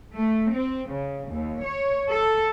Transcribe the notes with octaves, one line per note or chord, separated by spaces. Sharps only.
A3
C4
C#3
D#2
C#5
A4